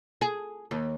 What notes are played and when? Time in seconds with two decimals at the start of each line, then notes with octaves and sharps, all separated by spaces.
0.21 G#4
0.71 D#2